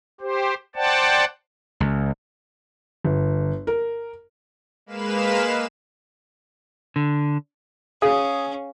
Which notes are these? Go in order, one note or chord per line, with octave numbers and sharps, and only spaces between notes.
G4 C5
C5 D5 F#5 G5 A5
C#2
G1
A#4
G#3 A#3 B4 F5 B5 E7
D3
C#4 G#4 F5 D#6